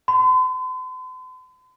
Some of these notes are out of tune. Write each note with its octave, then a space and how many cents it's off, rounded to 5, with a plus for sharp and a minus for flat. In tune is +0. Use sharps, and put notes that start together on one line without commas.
C6 -45